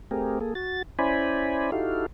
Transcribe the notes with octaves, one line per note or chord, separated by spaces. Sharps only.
A3 C4 G4 G#4 A#4
A#3 G#4 A4
F#4 A6
C#4 E4 C5 D5 G#5 B5
D#4 E4 F#4 G4 A4 F5